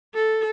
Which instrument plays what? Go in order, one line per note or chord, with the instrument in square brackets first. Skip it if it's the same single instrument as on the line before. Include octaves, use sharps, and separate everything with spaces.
[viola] A4